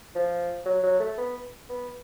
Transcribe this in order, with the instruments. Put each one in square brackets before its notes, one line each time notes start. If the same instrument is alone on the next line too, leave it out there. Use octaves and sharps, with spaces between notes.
[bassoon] F3
F#3
F#3
A3
B3
B3